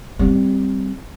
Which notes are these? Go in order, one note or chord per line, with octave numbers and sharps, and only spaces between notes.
G3 C4